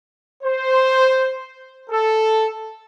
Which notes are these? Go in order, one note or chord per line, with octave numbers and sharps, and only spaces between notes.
C5
A4